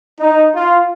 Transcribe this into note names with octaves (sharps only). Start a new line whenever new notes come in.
D#4
F4